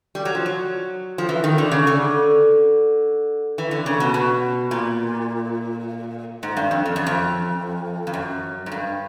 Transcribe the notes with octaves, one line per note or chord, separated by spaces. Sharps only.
G3
F#3
F3
F#3
F3
E3
D#3
D3
C#3
D3
E3
D3
C#3
B2
B2
A#2
G#2
G2
F2
F2
F#2
F2
F2
F#2
G#2
G2